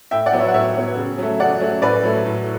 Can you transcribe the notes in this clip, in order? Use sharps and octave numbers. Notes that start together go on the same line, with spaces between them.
A2 E5 G5
D5 F#5
F#3 B3
C#5 E5
F#5
A2 C#5 E5
F#3 B3
C#3
F#3 A3
C#3 D5 F#5
F#3 A3
A2 B4 D5
F#3 A3
A2